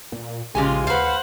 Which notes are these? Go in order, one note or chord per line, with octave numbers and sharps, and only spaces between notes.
A#2
A#1 C#3 G#3 F4 G4 G#5
D#2 B4 C5 F5 F#5